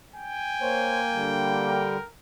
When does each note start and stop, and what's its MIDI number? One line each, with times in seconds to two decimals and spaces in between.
0.16 2.07 79
0.16 1.44 80
0.62 1.87 58
0.62 1.00 72
0.62 1.00 73
1.13 1.97 50
1.13 1.97 55
1.68 2.07 70